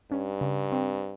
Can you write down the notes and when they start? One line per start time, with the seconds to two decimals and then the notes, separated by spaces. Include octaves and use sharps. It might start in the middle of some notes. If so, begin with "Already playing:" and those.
0.11 G2 C#4
0.41 C#3
0.72 C4